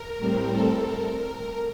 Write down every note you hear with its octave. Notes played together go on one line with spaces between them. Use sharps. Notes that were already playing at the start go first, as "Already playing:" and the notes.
Already playing: A#4
A2 G3 C4
A4
A#4
A#4